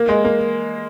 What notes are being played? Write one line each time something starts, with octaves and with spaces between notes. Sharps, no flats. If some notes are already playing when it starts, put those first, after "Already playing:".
Already playing: A#3
G#3
A#3